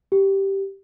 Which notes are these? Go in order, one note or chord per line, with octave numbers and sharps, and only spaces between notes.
G4